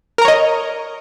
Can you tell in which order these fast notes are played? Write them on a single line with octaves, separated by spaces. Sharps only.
A#4 A#5 C#5 D#5